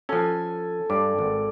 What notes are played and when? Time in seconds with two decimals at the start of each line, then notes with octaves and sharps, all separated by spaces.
0.09 F3 C#4 A4 G#5
0.90 G2 D5
1.19 G#1